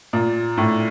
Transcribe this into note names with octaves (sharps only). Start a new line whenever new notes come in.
A#2
A2